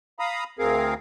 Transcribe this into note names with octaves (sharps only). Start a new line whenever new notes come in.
F5 A#5 B5 D#6
D2 C4 G#4 A#4 F5